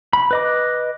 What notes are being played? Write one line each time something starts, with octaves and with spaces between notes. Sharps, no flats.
B5
B4 D#5 D6